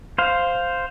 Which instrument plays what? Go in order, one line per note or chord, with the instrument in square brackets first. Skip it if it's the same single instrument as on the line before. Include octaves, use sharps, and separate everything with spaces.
[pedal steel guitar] C5 F5